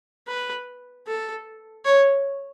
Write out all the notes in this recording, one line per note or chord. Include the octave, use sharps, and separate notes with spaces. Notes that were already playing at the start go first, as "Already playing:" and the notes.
B4
A4
C#5